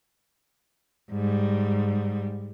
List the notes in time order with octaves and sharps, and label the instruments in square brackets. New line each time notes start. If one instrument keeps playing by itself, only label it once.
[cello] G#2 G3